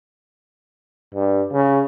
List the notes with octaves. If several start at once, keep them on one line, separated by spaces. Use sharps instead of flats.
G2
C#3